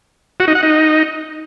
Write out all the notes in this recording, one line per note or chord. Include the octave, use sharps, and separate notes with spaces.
F#4
D#4
F#5
D#4